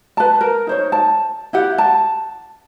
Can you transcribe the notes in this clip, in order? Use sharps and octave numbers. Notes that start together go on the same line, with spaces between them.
B4 A5
A#4
D#4 C5 C#5
A5
E4 G4 F#5
A5